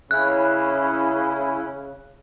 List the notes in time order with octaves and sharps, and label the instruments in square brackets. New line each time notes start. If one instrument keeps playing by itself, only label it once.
[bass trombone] C#3 [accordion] C#4 E4 [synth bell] F#6